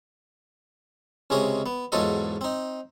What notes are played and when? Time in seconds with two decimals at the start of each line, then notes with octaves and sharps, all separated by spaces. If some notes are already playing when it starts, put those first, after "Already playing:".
1.30 C#2 C3 G#3 C#4 D#5 D#6
1.66 B3
1.92 E2 G#2 F#3 F4 A4 D#5
2.41 C4 D#4